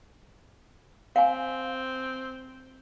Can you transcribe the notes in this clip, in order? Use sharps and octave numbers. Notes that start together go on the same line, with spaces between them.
C4 F5 G#5